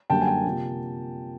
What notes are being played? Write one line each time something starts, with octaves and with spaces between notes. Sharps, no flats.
F#2 D3 G3 A#3 G5 A5
G#5
G5 A5
C3 F3 A#3